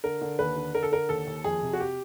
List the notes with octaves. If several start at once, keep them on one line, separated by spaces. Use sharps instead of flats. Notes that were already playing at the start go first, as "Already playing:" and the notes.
D3 A#4
D3
D#2 B4
D3
D3 A#4
A4
D3 A#4
D#2 A4
D#2
F2 G#4
C3
F#4
G4